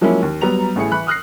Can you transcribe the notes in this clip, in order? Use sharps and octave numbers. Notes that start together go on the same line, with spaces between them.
F3 F#3 G#3 A#3 C#4 E4
D#2
F#3 G3 B3 A#5 F7
A1 A2 G#4 C#7
E3 B5 F#6
D#6 F6 F#6 A#6 C7